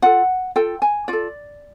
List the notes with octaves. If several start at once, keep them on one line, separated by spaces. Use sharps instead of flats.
F4 A4 F#5
F4 A4 G5
G#5
F4 A4 D5